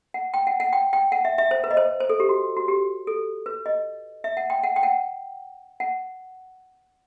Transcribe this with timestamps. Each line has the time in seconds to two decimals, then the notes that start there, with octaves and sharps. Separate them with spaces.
0.14 F#5
0.34 G5
0.47 F#5
0.60 F#5
0.73 G5
0.93 G5
1.12 F#5
1.25 E5
1.38 E5
1.51 C5
1.64 B4
1.71 D#5
1.77 C5
2.00 C5
2.10 A4
2.20 G4
2.29 F#4
2.57 F#4
2.68 G4
3.07 A4
3.46 B4
3.66 D#5
4.24 E5
4.37 F#5
4.50 G5
4.64 F#5
4.76 G5
4.83 F#5
5.80 F#5